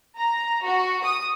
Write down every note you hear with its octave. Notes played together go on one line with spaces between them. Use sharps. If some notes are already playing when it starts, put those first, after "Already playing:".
A#5
F#4
D#6